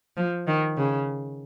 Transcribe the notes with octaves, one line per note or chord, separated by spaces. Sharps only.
F3
D#3
C#3